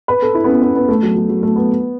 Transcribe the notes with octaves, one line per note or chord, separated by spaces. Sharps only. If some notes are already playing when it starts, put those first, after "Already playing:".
B4
A4
E4
B3
C#4
B3
B3
A3
F#3
F#3
F#3
A3
B3